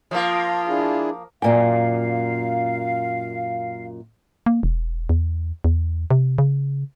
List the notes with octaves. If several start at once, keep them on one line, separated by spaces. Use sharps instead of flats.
F3 A#3 F4
D4 E4 G#4
F#2 A#2 D5 F5 G5 G#5
A#3
E1
E2
E2
C3
C#3